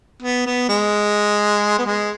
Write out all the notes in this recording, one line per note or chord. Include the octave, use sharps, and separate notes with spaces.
B3
B3
G#3
B3
G#3